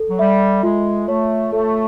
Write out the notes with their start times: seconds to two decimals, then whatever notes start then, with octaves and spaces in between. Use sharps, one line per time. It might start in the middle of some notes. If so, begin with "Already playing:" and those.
Already playing: A4
0.09 F#3
0.19 G3 E5
0.63 G#3 F4
1.08 A3 C#5
1.53 A3 A4